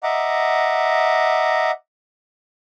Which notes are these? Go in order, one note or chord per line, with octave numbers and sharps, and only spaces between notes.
D#5 E5 F#5 A#5 D6